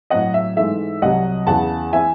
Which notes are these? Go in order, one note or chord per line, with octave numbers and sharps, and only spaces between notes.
A2 F#3 C4 D#5 F#5
E5
G#2 E3 A3 E5
C2 C3 F#3 D#5 F#5
E2 C#3 E3 F#5 A5
E3 C4 E5 G#5